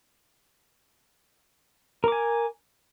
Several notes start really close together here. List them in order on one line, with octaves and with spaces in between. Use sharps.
A#4 D6 G#5